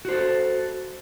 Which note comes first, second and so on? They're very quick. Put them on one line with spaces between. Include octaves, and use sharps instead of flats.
F#4 C5 A4